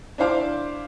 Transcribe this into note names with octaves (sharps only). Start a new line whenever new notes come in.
D4 E4 C5 F5 D6